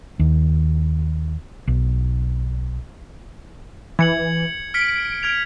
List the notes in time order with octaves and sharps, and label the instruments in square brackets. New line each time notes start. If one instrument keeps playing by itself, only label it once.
[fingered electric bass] D#2
B1
[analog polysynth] E3 [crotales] G#6 C#7 F#7
[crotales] F6 B6 C#7 [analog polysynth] D7
[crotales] F6 G#6 F7